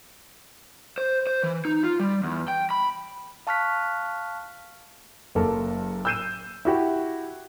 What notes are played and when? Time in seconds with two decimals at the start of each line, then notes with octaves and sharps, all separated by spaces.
0.98 C5
1.27 C5
1.43 E3
1.65 D#4
1.84 F4
2.00 G3
2.24 E2
2.48 G5
2.70 B5
3.47 F5 A5 C#6 F6 F#6 B6
5.35 F#1 F#2 A#3 A4
6.05 E6 F#6 G6 C7 D#7 E7
6.65 E4 F#4 G4